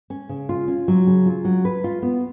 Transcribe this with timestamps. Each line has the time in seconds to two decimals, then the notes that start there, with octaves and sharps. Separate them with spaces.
0.10 C#4
0.29 C#3
0.49 F4
0.68 C#4
0.88 F#3
1.07 C#3
1.26 F4
1.45 F#3
1.65 B4
1.84 F4
2.02 B3